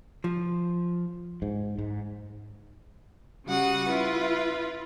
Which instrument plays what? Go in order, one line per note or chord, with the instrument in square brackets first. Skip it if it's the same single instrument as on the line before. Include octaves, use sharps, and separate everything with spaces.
[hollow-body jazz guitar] F3
[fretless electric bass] G#2
G#2
[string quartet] C#3 G3 F#4 F#5 D#6
E4 F4 B4